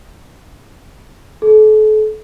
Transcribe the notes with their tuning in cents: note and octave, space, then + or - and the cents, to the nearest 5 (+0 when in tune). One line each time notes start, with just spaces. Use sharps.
A4 -40